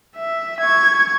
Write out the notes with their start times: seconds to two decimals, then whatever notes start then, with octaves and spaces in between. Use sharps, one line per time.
0.17 E5
0.60 C#6 G#6